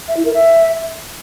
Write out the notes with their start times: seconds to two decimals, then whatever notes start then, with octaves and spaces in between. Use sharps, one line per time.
0.08 E5
0.17 E4
0.25 A#4
0.34 E5